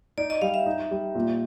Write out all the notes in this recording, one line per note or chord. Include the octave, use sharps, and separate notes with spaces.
D#4 D5
D#5
G3 F5
E5
D#4
G3
A#2